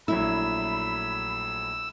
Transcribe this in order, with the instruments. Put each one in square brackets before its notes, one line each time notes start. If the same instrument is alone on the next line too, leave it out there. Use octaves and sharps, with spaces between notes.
[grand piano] A#1 F#3 A3 [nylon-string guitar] E4 [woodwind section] B5 [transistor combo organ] E6